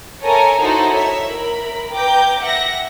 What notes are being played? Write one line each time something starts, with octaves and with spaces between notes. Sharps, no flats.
A4 A#4 C#5 E5 G#5 A#5
D#4 E4 F#4 A4 C5
C#5 E5
A#4 B5
B4 G5 A#5 D6 G6
E5 F#5 A#6